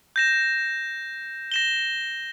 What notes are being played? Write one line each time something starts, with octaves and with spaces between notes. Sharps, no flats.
G6 A#6 E7
A#6 E7 G7